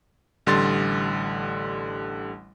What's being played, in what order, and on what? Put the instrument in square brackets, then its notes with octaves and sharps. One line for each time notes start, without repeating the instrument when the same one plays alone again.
[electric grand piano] A1 D3 G3 C6 A6